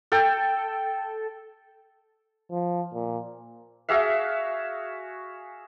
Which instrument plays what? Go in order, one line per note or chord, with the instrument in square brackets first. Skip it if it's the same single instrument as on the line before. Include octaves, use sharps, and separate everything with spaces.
[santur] A4 G5
[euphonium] F3
A#2
[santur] F#4 G#4 E5 F5